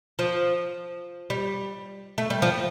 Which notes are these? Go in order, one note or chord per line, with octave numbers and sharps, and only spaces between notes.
F3
G3
A3
G3
F3